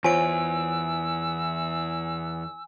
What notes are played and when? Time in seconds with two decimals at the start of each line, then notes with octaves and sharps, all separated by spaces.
0.04 E2 F4 C5 C#5 G#5 E6 D7